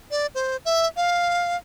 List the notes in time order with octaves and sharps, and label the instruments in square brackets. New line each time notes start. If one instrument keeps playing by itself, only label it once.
[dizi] D5
C5
E5
F5